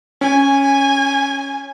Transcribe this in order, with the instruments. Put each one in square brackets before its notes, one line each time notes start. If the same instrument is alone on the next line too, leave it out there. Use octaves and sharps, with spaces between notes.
[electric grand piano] C#4 [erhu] G#5